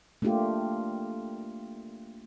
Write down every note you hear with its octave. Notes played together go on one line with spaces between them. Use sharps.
A3 A#3 D4 F4 G4